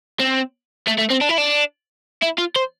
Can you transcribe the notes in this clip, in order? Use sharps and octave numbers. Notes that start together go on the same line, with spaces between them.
C4
A3
A3
C4
D4
E4
D4
E4
F4
C5